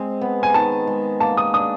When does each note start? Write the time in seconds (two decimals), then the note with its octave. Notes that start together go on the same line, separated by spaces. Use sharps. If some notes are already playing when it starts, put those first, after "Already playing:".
Already playing: G#3 C4
0.21 B3
0.43 G#5
0.54 D#3 A5
0.87 G#3
1.20 A#3 A5
1.37 D#6
1.54 D4 D#6